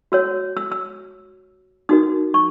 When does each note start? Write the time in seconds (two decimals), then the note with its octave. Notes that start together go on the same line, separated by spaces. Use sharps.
0.12 F#4 C#5 E6
0.57 E6
0.72 E6
1.89 D#4 F#4 A#4 D#6
2.34 C#6